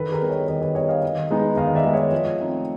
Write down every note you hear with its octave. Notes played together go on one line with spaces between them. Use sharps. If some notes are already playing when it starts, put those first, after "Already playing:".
Already playing: D#3 A4 B4
G#4 A#4
G3 B3
C#5 D#5
D#3 C#5 D#5
B4 C#5
G3 B3 C#5 D#5
D#5 F5
D#3
G#3 B3 D#4
D#3 D#5 F5
D5 E5
G#3 B3 D#4
C#5 D#5
F3
A3 C4 D#4